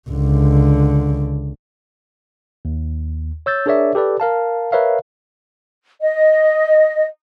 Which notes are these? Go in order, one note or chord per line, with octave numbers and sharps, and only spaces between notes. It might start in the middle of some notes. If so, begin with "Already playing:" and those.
C#2 D3
D#2
C#5 E6 G6 A6
D4 G#4 A#4 C#5 D5 E5
G4 A4 B4 D5
A#4 F5 A5
A#4 B4 C#5 E5 F5
D#5